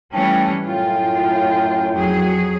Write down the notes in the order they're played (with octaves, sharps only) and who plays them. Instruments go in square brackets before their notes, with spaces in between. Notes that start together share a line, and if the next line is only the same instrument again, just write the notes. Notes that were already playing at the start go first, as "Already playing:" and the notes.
[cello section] E3 G3 C#4 [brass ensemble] A3 G5 A5
[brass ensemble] F#2 A2 G5 [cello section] F4
[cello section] F2 F#3 G#4